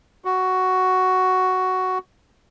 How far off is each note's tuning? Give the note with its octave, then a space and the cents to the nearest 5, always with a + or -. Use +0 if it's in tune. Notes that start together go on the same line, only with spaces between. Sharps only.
F#4 +5